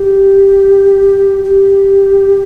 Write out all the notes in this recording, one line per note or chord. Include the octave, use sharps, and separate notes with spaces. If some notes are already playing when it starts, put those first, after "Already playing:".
Already playing: G4
G4